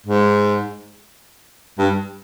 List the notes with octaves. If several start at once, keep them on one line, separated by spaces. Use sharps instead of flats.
G#2
G2